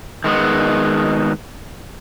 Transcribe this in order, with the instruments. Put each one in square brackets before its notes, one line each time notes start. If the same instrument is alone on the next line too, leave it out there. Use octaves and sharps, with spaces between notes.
[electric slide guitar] D#3 G#3 B3